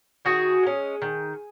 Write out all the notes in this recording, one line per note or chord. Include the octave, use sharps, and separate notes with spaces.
D#3 F#4 G#4
G#3 C#4
D#3